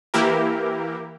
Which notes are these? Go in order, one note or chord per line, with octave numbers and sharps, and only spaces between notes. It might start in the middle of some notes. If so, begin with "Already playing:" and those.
E3 A#3 E4 G4 A#4